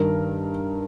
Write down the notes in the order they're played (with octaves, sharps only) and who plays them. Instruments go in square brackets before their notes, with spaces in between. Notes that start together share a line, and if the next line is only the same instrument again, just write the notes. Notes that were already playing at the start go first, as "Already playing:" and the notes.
Already playing: [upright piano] G2 D#3 A#4